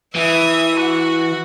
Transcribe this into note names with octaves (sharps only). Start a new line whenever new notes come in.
E3 E5 D#6
F#4 F#5